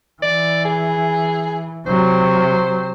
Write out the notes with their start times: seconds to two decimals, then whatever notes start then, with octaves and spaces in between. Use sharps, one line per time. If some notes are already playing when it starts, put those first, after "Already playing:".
0.22 E3 D5
0.65 G#4
1.86 C3 F#3 C5